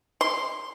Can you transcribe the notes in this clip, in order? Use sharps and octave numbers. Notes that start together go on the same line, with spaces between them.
C6